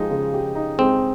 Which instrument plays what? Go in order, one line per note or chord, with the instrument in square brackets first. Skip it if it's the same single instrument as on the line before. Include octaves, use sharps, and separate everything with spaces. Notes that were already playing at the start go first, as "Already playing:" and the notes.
Already playing: [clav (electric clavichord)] F3 [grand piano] G#3 D#4 G4
[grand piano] C#3
G4
D#4
[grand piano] G#3 [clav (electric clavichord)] C4